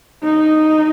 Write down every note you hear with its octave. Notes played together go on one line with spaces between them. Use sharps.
D#4